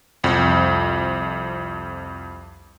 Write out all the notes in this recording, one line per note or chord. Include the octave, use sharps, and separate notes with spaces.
C2 F2